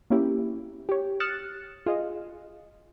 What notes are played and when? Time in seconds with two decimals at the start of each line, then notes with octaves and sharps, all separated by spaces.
0.10 A#3 C#4 E4 G4
0.89 G4 C#5
1.20 D#6 F6 F#6 A6 C#7 E7
1.86 F4 G#4 D#5 F5